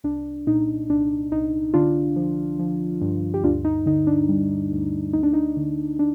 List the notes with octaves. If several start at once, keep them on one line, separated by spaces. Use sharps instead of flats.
C2 D4
A#2 D#4
C2 D4
C2 D#4
D3 D4 F4
F3
F3
G2
G4
D2 D4 F4
D#4
D3 D#4
D4
G3
D2
D2 D#4
D4
D#4
D3
D4